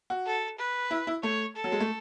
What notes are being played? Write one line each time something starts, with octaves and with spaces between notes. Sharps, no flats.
F#4
A4
B4
E4
E4
A3 C#5
A4
F#3
G#3
A3